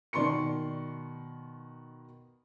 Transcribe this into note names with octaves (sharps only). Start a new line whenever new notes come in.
B2 D#3 D5 C6 C#6 C#7